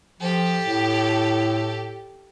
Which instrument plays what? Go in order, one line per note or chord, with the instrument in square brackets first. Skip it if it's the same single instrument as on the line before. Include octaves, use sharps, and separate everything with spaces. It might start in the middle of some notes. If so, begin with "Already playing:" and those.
[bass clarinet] F3 [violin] G4 A4
[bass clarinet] A2